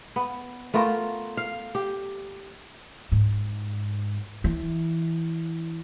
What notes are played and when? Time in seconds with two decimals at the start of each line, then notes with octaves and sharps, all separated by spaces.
0.16 B3
0.74 A3 B3 F4 A#4
1.37 F5
1.75 G4
3.12 G#2
4.44 E3